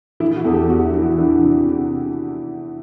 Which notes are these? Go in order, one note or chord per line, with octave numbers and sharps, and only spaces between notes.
E3 E4
E4
F#4
E2 A4
G4
E2 F#4
E4
E3
E4
E3 D4
C3
C3